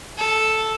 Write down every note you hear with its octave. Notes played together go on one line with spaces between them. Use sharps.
A4